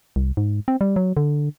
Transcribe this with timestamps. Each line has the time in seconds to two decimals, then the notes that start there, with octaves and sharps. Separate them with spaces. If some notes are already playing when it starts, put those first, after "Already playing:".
0.16 C2
0.37 G#2
0.68 C4
0.81 G3
0.96 F#3
1.17 D3